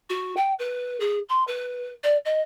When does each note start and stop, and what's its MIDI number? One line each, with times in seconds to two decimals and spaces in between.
0.10 0.35 66
0.37 0.52 79
0.59 0.99 71
1.00 1.19 68
1.29 1.43 84
1.47 1.89 71
2.04 2.17 74
2.25 2.41 75